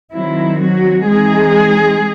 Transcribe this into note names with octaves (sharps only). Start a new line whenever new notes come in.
D#3 F#3 C4 E4
F#3 F#4
E3 G#3 C4 D#4 G#4